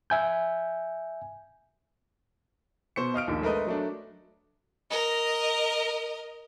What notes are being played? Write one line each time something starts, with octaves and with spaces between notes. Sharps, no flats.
E5 G#5 G6
B2 C5 C#6 C#7
D#5 F5 F6 D7
A#1 D#2 D4
G#3 A3 A#4 B4 D#5
F#3 A3 D4
A#4 D#5